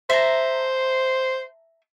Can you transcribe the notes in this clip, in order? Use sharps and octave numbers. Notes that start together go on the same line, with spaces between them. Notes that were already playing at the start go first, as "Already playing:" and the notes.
C5 E5 A5 A#5